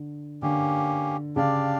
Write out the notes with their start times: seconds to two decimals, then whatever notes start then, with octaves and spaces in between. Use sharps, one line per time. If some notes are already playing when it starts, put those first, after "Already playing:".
Already playing: D3
0.42 D3 A#3 C#4 G4
1.36 C#3 D4 G4 D5 F5